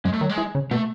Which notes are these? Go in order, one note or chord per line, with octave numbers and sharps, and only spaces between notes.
F#2 G#3
A3
D#3 F#3
G#3
E3
C#3
B2 A3